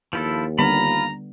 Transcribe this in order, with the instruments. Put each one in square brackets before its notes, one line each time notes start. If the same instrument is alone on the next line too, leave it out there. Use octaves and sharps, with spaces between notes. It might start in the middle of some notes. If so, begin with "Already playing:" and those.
[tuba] D#2 [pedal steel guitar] F3 E4 A4
[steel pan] D3 G3 B3 [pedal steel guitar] F4 B5 [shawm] A#5